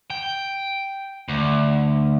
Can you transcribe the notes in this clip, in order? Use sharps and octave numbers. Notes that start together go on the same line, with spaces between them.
G5
D2